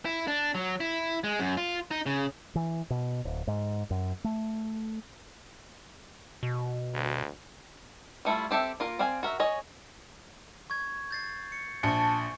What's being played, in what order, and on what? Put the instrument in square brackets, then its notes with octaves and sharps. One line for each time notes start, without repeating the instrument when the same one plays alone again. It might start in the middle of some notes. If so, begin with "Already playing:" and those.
[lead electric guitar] E4
D4
F#3
E4
G#3
F#2
F4
D#4
C#3
[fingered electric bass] E3
B2
D1
G#2
F#2
A3
[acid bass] B2
[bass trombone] D2
[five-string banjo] G3 A3 E4 F4
C4 G4 A4 E5
A#3 F4 A#4
C4 D5 F5 G#5
F#4 A#4 E5
G#4 C#5 D#5
[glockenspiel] C#6 G#6
G6 A6 C7
C#7
[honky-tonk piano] A#1 C#7 [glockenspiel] G#5 C#6 [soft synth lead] A5